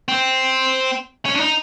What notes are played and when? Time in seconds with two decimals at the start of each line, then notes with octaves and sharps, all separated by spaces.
0.09 C4
1.25 C#4
1.36 D4
1.40 D#4